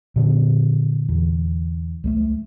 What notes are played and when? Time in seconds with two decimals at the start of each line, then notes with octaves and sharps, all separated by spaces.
0.16 A#2 D3 B3
1.09 E2
2.04 C#2 G3 A3